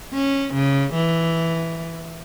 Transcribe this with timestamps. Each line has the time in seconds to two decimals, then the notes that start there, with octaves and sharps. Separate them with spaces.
0.13 C#4
0.54 C#3
0.94 E3